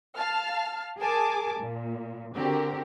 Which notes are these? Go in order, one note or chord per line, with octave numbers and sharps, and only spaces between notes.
F5 A5 F6
G#4 A#4 G#5 A5 D6
A#2
D3 C4 F#4 G4 A#4